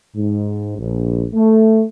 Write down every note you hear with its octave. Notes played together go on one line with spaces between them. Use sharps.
G#2
A#1
A3